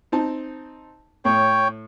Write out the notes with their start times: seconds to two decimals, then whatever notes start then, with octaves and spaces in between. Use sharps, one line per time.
0.12 C4 D#4 A5
1.25 A2 C#5 G5